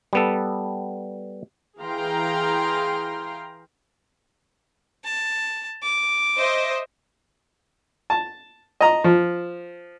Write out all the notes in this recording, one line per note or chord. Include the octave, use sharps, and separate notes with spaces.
G3 B3 A4
E3 G#4 F5 G5 A#5 C6
A5
D6
C5 D#5 E5
A5
D#5 A#5
F3